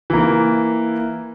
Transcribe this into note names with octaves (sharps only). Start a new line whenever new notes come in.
E3 A#3